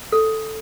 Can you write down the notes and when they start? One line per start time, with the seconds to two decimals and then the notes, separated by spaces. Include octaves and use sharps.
0.12 A4